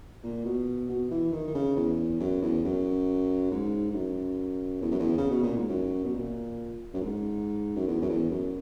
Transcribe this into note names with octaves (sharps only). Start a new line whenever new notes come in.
A#2
B2
B2
E3
D#3
D#3
C#3
E2
F#2
E2
F#2
G#2
G#2
F#2
E2
F#2
E2
C#3
B2
A#2
G#2
F#2
B2
A#2
F#2
G#2
F#2
E2
F#2
E2
F#2